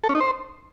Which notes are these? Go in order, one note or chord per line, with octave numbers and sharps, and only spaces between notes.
A4
C#4
D#4
C5